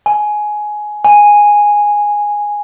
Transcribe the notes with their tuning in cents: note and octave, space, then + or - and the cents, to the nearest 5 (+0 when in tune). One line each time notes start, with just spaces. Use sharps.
G#5 +15
G#5 -5